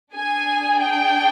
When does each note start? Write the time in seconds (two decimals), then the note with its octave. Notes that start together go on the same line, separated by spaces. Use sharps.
0.13 D4 G#4 G#5
0.79 G5